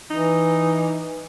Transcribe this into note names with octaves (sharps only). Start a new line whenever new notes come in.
E3 D#4